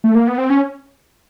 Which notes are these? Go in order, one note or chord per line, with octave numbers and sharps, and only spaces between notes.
A3
A#3
B3
C4
C#4